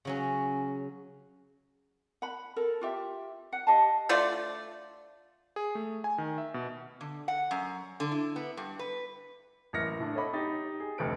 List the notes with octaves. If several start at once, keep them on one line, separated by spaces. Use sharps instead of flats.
C#3 F#3 C#4
F#5 B5
A4 A#4
F4 G4 E5
F#5
G4 D#5 F5 A5
D3 A3 F4 D5
G#4
A3
G#5
D#3
E5
B2
D3
F#5
F#2
D3
E4
B3
G2
B4
A1 F#2 A#3 F6 A#6 C#7
A2 D4
A4 C#5 D#5 F#5 B5 D6
D#4 G4 A6
G#4
F1 D2 C4 A4 B4 D7